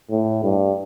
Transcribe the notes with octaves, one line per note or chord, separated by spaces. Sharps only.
A2
G2